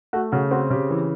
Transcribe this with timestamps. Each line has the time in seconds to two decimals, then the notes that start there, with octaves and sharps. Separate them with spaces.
0.13 A3 F#4
0.32 C#3 F#4
0.51 C4 F#4
0.70 C#3 G4
0.90 E3